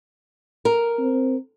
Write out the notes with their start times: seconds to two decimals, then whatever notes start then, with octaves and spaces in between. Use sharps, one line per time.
0.65 A#4
0.99 C4